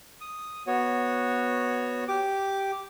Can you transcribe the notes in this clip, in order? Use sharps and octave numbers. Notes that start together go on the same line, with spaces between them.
D#6
B3 F#4 C#5
G4 D6